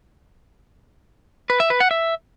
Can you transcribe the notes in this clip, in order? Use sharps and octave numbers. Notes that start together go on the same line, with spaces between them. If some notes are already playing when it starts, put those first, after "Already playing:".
B4
E5
B4
F#5
E5